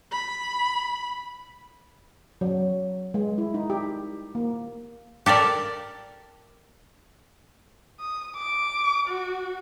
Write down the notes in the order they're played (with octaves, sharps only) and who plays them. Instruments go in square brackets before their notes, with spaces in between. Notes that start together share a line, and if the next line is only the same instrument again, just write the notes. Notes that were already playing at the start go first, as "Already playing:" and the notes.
[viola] B5
[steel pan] F#3
G#3
E4
D#4
G4
A#3
[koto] G4 A4 A#4 D5
[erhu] D#6
D6
F#4